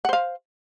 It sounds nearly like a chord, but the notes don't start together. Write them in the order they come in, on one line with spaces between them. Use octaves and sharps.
F#5 C5 F5